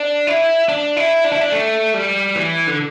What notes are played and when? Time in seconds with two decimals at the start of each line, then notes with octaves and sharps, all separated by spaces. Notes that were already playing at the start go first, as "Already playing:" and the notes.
Already playing: D4
0.27 E4
0.69 D4
0.97 E4
1.24 D4
1.32 E4
1.41 D4
1.52 A3
1.94 G3
2.35 E3
2.67 D3